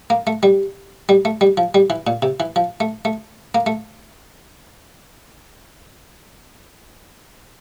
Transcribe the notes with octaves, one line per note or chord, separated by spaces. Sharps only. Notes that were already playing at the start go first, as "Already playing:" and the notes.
A#3
A3
G3
G3
A3
G3
F3
G3
E3
A#2
C3
E3
F3
A3
A3
A#3
A3